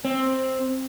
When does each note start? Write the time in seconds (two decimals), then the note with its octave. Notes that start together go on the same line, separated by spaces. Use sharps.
0.05 C4